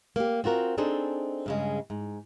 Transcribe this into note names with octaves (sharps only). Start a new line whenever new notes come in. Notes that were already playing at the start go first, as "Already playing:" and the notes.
A#3 G4
C4 F4 F#4 A#4
C4 D4 D#4 G#4 A4 C5
G2 C#3 G#3
G#2